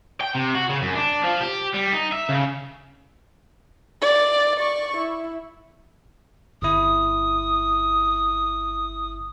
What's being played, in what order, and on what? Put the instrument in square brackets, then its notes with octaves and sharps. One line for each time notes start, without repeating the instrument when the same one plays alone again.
[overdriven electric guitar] G5
C3
F#4
C#3
F#2
D4
F3
G4
G3
D#4
E5
C#3
[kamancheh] D5
D5 C#6
E4
[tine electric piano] G1 E4 [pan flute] D#6